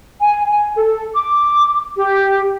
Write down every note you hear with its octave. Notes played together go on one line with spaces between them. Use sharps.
G#5
G#5
A4
D6
G4